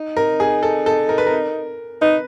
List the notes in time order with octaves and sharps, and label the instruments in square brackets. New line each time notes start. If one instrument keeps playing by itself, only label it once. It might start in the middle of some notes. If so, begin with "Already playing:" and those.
Already playing: [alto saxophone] D#4
[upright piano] A#4
G#4
A4
A4
A#4
B4
A#4
[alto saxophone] D#4 [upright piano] B4